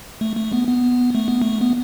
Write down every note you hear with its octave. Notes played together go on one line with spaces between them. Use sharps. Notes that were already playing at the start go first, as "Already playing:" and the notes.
A3
A3
B3
B3
A3
B3
A3
B3